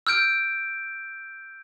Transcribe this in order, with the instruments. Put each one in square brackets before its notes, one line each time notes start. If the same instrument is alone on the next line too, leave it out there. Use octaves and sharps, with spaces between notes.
[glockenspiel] E6 F6 G6 D7